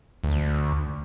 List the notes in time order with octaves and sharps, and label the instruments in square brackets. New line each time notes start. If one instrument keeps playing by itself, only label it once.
[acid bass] D2